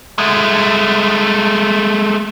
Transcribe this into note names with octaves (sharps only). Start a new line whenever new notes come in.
G#3 A3